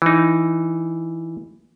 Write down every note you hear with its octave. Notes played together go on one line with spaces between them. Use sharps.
E3 D#4